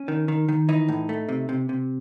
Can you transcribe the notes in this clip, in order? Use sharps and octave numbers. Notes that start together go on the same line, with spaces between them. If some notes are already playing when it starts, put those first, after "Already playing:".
Already playing: C#4
D#3
D#3
D#3
E3 D#4
A2
A3
C3
C3
C3